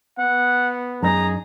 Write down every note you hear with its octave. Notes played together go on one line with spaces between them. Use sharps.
B3 F#5
F#2 D#4 G#4 A#5